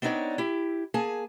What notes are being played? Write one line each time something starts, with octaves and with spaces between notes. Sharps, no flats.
B3 C4 D4 D#4 C#5 D5
E4 G4
A#3 G#4 G#5 A5